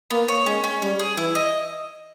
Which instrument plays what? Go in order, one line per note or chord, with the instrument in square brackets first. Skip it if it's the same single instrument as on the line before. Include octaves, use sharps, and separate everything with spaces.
[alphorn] A#3 [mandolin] B3
[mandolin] C#5
[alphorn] G#3 [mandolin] C#4
[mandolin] C#4
[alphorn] G3 [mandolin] C#4
[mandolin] G#4
[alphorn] E3 [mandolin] E4
[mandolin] D#5